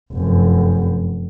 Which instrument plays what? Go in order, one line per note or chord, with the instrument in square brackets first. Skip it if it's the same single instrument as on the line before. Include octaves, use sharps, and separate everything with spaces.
[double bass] F1 F#2